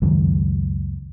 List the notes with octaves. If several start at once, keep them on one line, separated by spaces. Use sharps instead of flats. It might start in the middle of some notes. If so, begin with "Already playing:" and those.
C#2 F#2 D#3